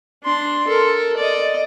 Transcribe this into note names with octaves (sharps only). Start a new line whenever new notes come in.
D4 C6
A4 A#4
D5 D#5